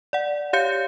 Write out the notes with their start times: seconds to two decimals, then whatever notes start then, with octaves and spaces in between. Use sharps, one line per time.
0.13 D5 F#5
0.53 G4 C#5 F5 G6 C#7